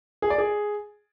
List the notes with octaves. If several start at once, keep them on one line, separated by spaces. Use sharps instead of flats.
G#4
D5
G#4